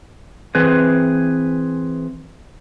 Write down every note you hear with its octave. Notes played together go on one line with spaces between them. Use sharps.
E3 C4 G#4 B4